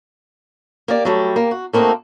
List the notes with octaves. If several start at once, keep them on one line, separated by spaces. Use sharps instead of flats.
A#3 G4 D5
F#3 G3 A3
A#3 G4
F#4
A3 A#3 C4 D4 D#4 F#4